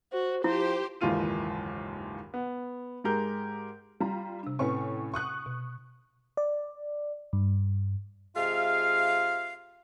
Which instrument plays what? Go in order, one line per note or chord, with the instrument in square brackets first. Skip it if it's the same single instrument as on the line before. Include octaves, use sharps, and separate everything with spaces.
[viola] F#4 [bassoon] C5
[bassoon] F3 [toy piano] E4 [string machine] G4 [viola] C5
[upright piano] F#1 D#2 G#2 E3 F4 D#7
B3
G#2 G#3 G4 A#4 G6
[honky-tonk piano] G3 F4 A#5
[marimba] C3 D4
[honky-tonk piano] A2 C#4 C#6 [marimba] C4 B4
[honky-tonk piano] C#6 D#6 F#6
[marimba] B2
[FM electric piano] D5
G2
[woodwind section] C3 G#3 F4 E5 F5